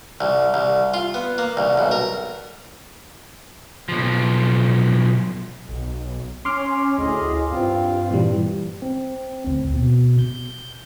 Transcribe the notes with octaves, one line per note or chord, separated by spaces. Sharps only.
C2
C2
F4
B3
A#3
C2
B1
A#4
B1 F3
B1
C#4 C6 D6 F6
D2 A2 G#4 D#5
G2 C4 F4 F5
A#2 E3 G3
C4
D2
B2
G6